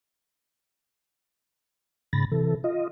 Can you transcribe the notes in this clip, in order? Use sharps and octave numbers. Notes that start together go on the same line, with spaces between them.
G#2 C#3 B5 A6 A#6
C3 E3 A4
F4 D#5